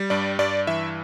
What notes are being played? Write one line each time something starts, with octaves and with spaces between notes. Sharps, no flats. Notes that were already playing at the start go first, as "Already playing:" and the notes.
Already playing: G3
G2 D5
G2 D5
E3 E5